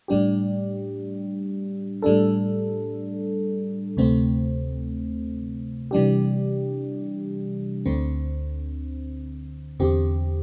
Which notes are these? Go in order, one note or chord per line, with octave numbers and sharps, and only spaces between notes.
A2 G3 D4 G4
A2 G3 D4 A4
D2 C3 A3 C4
C3 E3 G3 D4 G4
D2 D3 C4
E2 D3 C4 G4